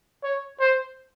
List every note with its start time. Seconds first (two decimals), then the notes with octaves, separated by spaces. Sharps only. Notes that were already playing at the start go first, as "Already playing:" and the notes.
0.24 C#5
0.60 C5